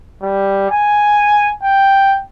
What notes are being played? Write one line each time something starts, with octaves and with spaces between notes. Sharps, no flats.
G3
G#5
G5